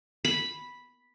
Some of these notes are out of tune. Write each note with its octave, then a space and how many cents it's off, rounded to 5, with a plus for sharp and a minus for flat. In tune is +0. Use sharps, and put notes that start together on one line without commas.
B5 -5